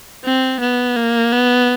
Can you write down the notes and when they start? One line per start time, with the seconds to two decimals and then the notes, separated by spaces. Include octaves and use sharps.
0.24 C4
0.60 B3
0.96 A#3
1.32 B3